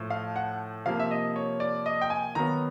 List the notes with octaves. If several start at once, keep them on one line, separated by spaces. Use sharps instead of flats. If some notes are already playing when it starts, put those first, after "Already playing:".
Already playing: A2 F3 A3
F5
F#5
C3 F3 A#3 F5
E5
D#5
C#5
D5
D#5
G5
G#5
D#3 F#3 B3 A#5